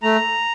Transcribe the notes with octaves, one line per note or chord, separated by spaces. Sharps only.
A3 A#5